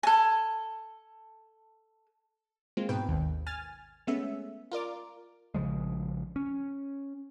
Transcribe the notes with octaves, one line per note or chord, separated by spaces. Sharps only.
A4 G#5
G#3 A#3 C4 F4
G#2 B2 B4 G5
G#1 D#2
G#5 F6 A6
G#3 A3 B3 C#4 E5
F4 A#4 D5 D6
A#1 C#3 F3 G#3
C#4